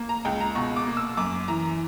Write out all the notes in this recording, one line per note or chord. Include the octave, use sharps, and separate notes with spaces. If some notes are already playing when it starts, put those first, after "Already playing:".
Already playing: A#3
A#5
C#2 G5
A#5
B2 C#6
D6
A#3
E6
F#2 D6
E3 A#5